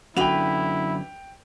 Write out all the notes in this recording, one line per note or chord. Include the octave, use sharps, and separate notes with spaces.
F#2 D3 E4 F#4 B4 G5 F7